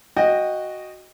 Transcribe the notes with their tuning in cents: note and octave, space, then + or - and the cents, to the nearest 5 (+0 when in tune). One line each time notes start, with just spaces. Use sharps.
F#4 +0 D#5 -5 G5 +20